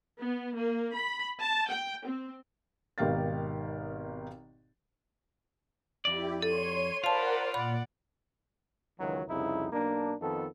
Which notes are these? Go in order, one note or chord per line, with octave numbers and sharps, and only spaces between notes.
B3
A#3
B5
A5
G5
C4
G#1 B2 D#3 G4 F5 A6
F2 E4 G4 D5
A4 C#5 C6 D#7
F4 A#4 C5 D5 F5 F#5 A5 B5
A#2 D5 F#5 B5
C#2 D#3 E3 F#3
C2 F2 C#3 D#4 E4
B1 A#3 D4
F2 D#3 B3 A4